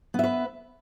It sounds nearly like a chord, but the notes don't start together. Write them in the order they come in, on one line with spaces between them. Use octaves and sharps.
B3 E5 B4